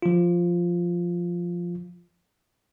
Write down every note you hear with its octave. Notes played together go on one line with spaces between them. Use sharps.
F3 F4